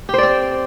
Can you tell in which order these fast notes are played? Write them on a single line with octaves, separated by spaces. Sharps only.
G4 C5 D5 C4